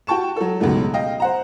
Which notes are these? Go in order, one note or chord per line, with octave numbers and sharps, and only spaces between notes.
F#4 G5 A5 C#6 E7
F#3 A4
C#2 G#2 B2 F#3 A3
D#5 F5 G5
C5 F#5 A#5